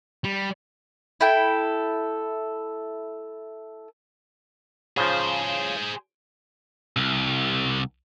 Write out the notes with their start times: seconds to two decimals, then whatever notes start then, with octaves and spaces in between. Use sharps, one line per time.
0.24 G3
1.21 E4 A4 G5
4.97 C#3 F3 G#4 C5
6.96 C2